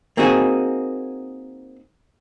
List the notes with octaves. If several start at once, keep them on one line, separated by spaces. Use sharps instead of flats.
A#3 C4 D#4 F#4 G#4